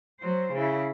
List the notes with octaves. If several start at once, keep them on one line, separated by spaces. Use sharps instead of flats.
F#3 C5
C#3 E4